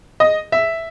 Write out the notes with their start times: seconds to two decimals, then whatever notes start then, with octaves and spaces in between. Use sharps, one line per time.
0.20 D#5
0.52 E5